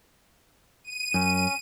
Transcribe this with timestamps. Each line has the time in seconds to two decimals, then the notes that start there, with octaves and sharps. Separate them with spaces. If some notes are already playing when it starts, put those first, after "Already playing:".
0.84 D#7
1.14 F#2 C#4